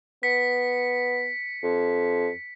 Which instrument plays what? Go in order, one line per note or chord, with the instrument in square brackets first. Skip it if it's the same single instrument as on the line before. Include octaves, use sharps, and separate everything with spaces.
[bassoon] B3 [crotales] B6 C#7
[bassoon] F2